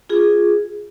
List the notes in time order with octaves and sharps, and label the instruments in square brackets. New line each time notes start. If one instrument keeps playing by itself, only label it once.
[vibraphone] F4 G#4